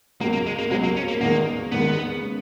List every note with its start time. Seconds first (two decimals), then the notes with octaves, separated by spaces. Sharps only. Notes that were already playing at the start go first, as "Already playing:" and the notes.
0.20 C#2 B2 F#3 A#3
0.33 A#3
0.46 G#3
0.58 A#3
0.71 C#2 B2 F#3 G#3
0.84 A#3
0.97 C#4
1.08 A#3
1.21 E2 D#3 G#3 A#3
1.72 E2 D#3 G#3 B3
2.22 C#3 G#3